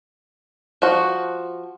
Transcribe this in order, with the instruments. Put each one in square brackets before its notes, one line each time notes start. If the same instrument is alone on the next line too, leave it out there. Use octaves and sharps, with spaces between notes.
[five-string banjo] F3 F#4